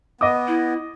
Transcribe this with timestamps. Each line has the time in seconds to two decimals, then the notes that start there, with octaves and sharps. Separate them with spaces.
0.21 B3 D#5 D6 D#6
0.48 E4